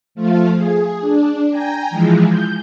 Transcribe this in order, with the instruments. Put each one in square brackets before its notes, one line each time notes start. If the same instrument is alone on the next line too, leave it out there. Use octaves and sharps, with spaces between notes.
[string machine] F3 A3 F4
G#4
D4
G5 G#5 A#5
E3 F3 G#3
G6